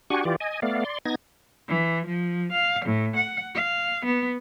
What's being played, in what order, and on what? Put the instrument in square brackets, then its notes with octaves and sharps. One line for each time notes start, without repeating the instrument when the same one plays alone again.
[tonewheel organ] D4 F#4 G4 F#5 G#5 C#6
E3 F4 G4 D5
D#5 G#5
A3 B3 D5 F5
D5 C6
B3 D#4 G#6 A#6
[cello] E3
F3
F5
A2
F#5
F5
B3